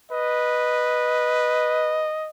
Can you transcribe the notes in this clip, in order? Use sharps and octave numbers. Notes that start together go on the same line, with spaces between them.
B4 D#5